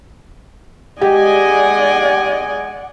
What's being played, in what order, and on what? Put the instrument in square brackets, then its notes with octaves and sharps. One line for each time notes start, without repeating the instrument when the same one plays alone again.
[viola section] G#3 D#5 G#5 [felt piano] G4 [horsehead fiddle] D5 F#5